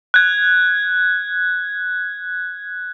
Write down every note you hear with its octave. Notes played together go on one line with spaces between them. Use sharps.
F#6 G#6